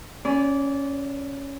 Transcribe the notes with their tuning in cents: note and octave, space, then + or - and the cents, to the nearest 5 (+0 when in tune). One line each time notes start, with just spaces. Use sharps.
C#4 +0 D5 -20 B5 +45